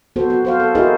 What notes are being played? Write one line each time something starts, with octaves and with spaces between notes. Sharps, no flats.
B3 F#4 A4 C5
F#4
F#4 C5 F5
A4
E4 F#4 G#4 A#4 C5 D#5